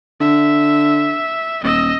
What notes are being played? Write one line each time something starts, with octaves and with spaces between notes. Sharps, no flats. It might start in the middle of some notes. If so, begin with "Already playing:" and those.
D3 E5
D#1 D#5 E6